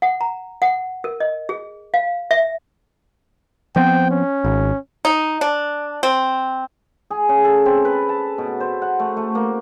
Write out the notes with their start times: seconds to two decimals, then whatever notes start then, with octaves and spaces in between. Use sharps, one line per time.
0.02 F#5
0.21 A#5
0.62 F#5
1.04 A#4
1.20 D#5
1.49 G#4
1.94 F5
2.31 E5
3.76 F3 B3 C4 G5
4.11 C#4
4.44 G#1
5.05 D#4
5.41 D4
6.03 C4
7.10 G#4
7.29 C#3
7.44 A4
7.66 C4
7.85 B4
8.09 A5
8.38 B2
8.60 C5
8.82 F#5
8.99 A3
9.17 A3
9.35 A#3